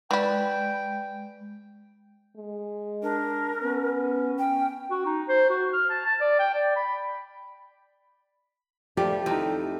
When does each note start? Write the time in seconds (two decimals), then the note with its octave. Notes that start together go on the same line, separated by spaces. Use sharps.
0.11 E3 G#3 E4 B4 D5 G5 B5
2.37 G#3
3.03 D4 A#4
3.62 B3 C#4
4.39 G5
4.91 F#4
5.06 D#4
5.28 C5
5.50 F#4
5.73 F6
5.90 A5
6.06 A5
6.21 D5
6.39 G5
6.54 D5
6.76 B5
8.97 F3 G3 A3 G4
9.26 F2 C4 D#4 E4